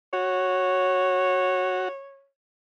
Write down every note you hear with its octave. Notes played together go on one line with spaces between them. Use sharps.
F#4 C#5